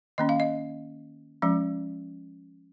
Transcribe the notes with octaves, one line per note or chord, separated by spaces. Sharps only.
D#3 A#3 C#4 D#5
F5
D#5
F3 G#3 C#4